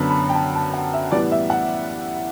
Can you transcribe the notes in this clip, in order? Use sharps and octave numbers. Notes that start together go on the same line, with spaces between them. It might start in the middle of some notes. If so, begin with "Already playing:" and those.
Already playing: F#2 D3 B3 A5 B5
B5
G5
A5
A5
F#5
E5
A2 E3 G3 B3 D5
E5
F#5